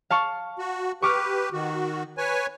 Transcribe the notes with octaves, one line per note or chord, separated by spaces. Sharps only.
F5 A5 C#6
F#4
G4 B4 C#6 D6 F6
D#3 F#4
B4 C#5 G#5